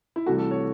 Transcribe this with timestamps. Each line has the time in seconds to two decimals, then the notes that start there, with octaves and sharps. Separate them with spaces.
0.16 E4
0.26 C2 C3 E3 A3 F#4
0.38 A4
0.51 C#5